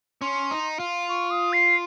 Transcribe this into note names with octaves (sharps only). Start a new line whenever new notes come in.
C#4 C6
D#4
F4
C#6
D#6
C7